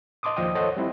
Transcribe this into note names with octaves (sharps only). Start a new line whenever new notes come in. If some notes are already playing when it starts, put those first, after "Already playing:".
D#5 A5 C6 D6 D#6
D#2 F3 D5 D#5 G5 D#6
A4 C5 C#5 D#5 F#5
G3 C4 E4